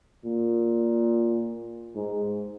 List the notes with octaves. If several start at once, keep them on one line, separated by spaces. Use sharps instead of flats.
A#2
G#2